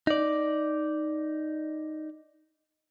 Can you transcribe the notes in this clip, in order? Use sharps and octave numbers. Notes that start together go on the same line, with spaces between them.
D#4 D5